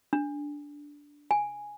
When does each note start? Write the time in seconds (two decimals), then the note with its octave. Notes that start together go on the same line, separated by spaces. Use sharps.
0.13 D4
1.31 G#5